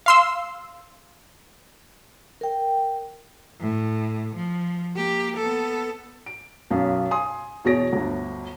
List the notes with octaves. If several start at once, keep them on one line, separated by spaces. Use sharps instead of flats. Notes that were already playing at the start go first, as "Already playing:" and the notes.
F5 C6 E6
A#4 G5
A2
F3
A#3 G4
B3 A4
D7
B1 F#2 F5
G#5 C6 D#6
E2 B2 G#4 C#5 A#6 D7
G1 D2